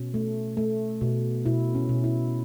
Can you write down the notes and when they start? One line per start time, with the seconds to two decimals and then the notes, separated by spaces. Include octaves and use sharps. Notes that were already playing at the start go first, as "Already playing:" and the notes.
Already playing: B2 C#4
0.14 A3
0.57 A3
1.01 B2
1.45 B2 E4
1.74 C#4
1.89 B2
2.04 E4